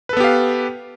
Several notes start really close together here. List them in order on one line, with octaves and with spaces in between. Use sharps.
B4 A4 B3 G4 F5